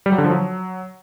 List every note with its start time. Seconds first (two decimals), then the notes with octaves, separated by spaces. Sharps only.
0.06 G3
0.12 F#3
0.18 D3
0.24 F3
0.31 F#3